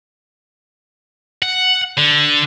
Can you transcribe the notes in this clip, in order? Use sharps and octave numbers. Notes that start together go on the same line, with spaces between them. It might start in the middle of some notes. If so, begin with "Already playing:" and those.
F#5
D3